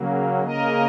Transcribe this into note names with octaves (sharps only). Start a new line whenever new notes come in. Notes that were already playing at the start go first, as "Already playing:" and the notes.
Already playing: C#3 F#3 A#3
C#3 A#3 A#4 D#5